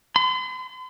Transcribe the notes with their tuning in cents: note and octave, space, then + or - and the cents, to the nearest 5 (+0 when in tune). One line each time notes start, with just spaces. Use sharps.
C6 -45